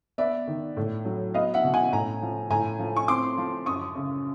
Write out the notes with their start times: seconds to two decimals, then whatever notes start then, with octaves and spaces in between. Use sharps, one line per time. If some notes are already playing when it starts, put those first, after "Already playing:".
0.18 B3 D5 E5
0.47 D#3
0.77 A2
1.05 F#3
1.34 B3 D#5 F5
1.54 E5 F#5
1.64 B2
1.74 F#5 G#5
1.92 A2 G#5 A#5
2.22 F3
2.50 A2 G#5 A#5
2.79 F3
2.96 C#6
3.08 C4 C6 D6
3.38 F3
3.66 F#2 C#6 D#6
3.95 C#3